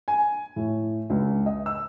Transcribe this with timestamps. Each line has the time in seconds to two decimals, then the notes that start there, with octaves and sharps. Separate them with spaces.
0.08 G#5
0.56 A2
1.10 C#2
1.46 D#5
1.66 E6